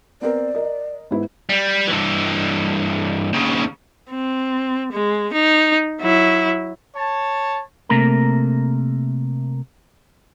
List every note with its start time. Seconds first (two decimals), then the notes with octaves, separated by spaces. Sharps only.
0.21 B3 C4 A#4 D5
0.55 A#4 D#5
1.11 G#2 B3 E4
1.49 G3
1.88 G2 E3
3.33 D#2 C#3
4.10 C4
4.92 G#3
5.33 D#4
6.01 F#3 E4
6.96 C#5 A5
7.89 C3 A3 A#3 A#4 A#5